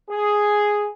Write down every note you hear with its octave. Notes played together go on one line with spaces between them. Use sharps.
G#4